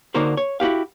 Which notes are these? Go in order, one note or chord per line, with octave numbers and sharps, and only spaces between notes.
D3 A#3 D#4 F#4 A#4 C5
C#5
E4 F#4 G4 F5